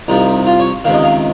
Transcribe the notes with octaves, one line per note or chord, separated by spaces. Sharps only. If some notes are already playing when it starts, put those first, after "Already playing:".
C2 C3 F3 D#4
F4
C#5
C#2 C3 D#3 F5
D#5
F5